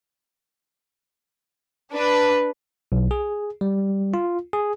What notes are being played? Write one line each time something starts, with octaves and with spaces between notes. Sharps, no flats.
D4 B4
B1
G#4
G3
F4
G#4